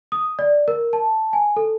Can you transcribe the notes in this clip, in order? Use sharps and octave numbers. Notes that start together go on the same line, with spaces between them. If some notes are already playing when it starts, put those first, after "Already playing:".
D#6
D5
A#4
A5
G#5
A4